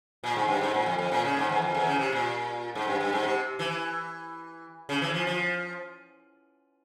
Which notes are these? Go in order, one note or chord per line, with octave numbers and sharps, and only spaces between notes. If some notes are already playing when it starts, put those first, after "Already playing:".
A#2
G#2
G2
G#2
A#2
F2
F2
A#2
C#3
G#2
E2
F2
E2
C#3
C3
A#2
G#2
G2
G2
G#2
C3
E3
C#3
E3
F3
F3